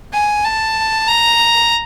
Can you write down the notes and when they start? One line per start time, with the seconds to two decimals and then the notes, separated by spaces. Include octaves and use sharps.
0.13 G#5
0.45 A5
1.08 A#5